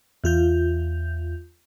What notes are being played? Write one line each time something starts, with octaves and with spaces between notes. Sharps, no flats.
E2 F4 G6